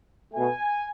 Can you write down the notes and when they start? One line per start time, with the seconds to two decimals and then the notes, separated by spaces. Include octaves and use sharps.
0.33 B2 A3 G#5